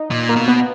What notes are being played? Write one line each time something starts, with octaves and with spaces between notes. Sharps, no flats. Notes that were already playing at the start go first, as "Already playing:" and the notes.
Already playing: D#4
A#2
A#3
B2
B3